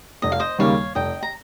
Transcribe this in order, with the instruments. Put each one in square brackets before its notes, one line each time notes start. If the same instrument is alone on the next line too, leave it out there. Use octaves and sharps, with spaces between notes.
[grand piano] F1 [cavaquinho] D#5
[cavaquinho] F5
C5 D#5
[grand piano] D#2 C#3 G3 A#3 [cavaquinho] C#5 F5
[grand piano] F1 [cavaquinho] D#5 G5
[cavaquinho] A#5